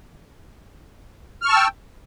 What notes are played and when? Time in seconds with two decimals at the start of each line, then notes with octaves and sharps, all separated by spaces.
1.42 F6
1.45 C#6
1.49 A5
1.52 E6
1.56 G5